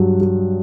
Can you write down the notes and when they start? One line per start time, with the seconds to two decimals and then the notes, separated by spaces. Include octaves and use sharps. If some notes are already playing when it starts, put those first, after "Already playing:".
Already playing: G2 F#3
0.21 F#3